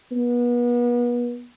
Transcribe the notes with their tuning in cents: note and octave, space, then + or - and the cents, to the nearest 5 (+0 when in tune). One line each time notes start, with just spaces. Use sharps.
B3 -35